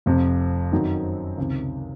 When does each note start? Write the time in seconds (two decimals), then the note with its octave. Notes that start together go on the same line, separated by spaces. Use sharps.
0.06 F1 F2 C3
0.72 F#2 D#3 F#3 C4 D#4
1.38 C#2 C3 D#3